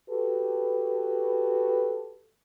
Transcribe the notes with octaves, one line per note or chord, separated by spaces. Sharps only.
F#4 G4 A4 B4